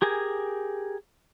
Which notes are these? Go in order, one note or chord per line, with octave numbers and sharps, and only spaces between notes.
G4 G#4 A#4 G#5